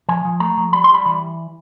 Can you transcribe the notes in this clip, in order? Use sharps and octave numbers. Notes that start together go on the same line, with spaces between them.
F3 G#5
F3
A3 A#5
F3
G3 B5
C6
G3
B5
E3 B5